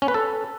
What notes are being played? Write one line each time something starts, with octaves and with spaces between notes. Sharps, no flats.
C#4
B4
A4